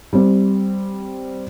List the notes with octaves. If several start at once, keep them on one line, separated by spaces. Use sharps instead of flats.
G3 C4